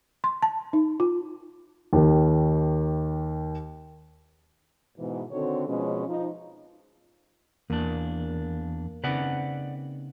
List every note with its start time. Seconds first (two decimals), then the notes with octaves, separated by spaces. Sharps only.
0.24 C6
0.42 A5
0.73 D#4
1.00 F4
1.93 D#2 D#3
4.99 G#2 B2 E3
5.32 D3 D#3 C4 F#4 A4 C#5
5.67 B2 F3 G#3 C#4
6.08 F3 D#4
7.70 E2 A#3 D4
9.04 C#3 C4 D#4 B4 D5 F#5